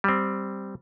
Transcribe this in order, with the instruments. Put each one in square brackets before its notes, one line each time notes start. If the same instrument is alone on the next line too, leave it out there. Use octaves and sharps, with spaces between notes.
[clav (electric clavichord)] G3 C4